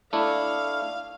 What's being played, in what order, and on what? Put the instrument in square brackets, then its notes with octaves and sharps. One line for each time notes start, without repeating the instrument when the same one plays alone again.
[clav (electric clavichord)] A3 D4 E4 [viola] F5